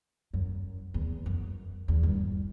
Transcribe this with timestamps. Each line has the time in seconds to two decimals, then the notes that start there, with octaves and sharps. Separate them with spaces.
0.33 F#2
0.94 E2
1.26 F#2
1.88 E2
2.03 G2